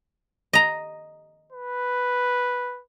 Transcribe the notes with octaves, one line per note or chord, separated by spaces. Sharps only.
D#5 A#5
B4